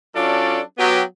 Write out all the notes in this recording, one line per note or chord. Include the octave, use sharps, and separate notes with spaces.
F#3 C#4 D4 F4 A4 D5
F#3 B3 G4